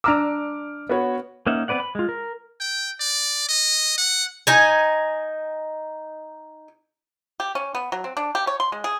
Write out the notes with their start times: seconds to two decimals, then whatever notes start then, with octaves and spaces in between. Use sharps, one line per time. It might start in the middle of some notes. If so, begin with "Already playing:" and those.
0.04 D4 A#5 D6 E6 F6 D7
0.89 B3 F#4 C#5
1.47 A#3 C#4 D#4 E5 F#5
1.68 B3 C4 B4 D5 F#5
1.80 B5
1.95 G#3 F4
2.09 A#4
2.60 G5
3.00 D5
3.49 D#5
3.98 F#5
4.47 D#4 G#5
7.40 G4
7.55 C#4
7.75 B3
7.92 F#3
8.04 C4
8.17 D4
8.35 G4
8.47 C#5
8.60 C6
8.72 G#3
8.84 G#4